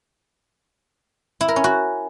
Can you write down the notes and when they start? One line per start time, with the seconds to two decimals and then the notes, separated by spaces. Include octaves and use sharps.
1.41 E4
1.48 A#4
1.56 C#4
1.64 F#4